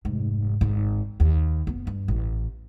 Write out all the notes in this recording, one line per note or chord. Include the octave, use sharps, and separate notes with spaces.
F1 G#2
G#1 G#2
D#2
F#1 B3
G2
A1